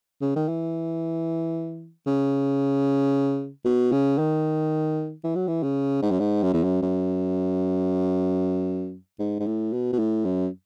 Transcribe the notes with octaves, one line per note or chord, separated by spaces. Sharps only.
C#3
D#3
E3
C#3
B2
C#3
D#3
E3
F#3
E3
C#3
G#2
F#2
G#2
F#2
E2
F#2
F#2
G#2
G#2
A2
B2
B2
A2
F#2